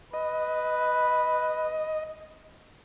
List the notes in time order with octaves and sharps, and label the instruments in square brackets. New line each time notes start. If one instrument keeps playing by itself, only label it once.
[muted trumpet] B4 [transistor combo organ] D#5